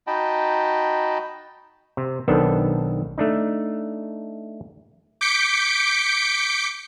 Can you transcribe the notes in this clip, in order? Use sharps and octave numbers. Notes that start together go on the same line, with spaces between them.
D#4 F#4 D#5 G5 A5 B5
C3
B1 D#3 B3 C4 D4 A4
A3 D4 D#4
D6 G6 B6 C#7 D7